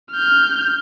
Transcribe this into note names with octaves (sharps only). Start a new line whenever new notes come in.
F6 G6